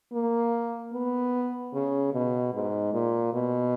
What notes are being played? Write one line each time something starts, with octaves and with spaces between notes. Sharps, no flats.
A#3
B3
C#3
B2
G#2
A#2
B2